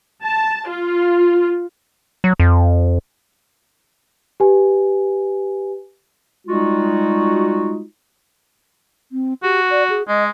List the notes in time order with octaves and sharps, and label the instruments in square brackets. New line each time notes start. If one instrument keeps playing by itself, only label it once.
[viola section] A5
F4
[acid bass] F#3
F2
[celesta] G4 B4 G#5
[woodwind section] G3 G#3 D#4 F4 F#4
[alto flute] C4
[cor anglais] F#4 [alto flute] G4
[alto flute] D5
G#4
[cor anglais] G#3 [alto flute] D#5